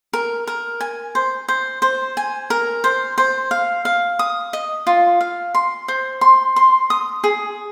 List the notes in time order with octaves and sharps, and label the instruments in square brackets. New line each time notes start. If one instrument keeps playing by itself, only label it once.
[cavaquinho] A#4
A#4
G#5
C5
C5
C5
G#5
A#4
C5
C5
F5
F5
D#6
D#5
F4
F5
C6
C5
C6
C6
D#6
G#4